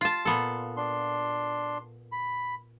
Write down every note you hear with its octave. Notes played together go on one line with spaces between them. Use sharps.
F4 A5
A#2 B3 A4
D4 C6
B5